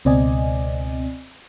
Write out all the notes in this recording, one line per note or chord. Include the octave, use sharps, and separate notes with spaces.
C#2 B2 C4 D5 D#5 G#5